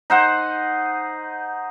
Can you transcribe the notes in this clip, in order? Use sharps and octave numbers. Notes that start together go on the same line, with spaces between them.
D#4 C5 F#5